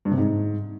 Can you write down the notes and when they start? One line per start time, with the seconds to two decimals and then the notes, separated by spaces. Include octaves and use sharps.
0.05 G2
0.11 C3
0.18 G#2